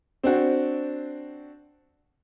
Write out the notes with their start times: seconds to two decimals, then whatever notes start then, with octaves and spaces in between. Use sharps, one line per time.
0.24 C4 D4 F#4